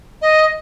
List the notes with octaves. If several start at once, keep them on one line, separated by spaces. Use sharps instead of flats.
D#5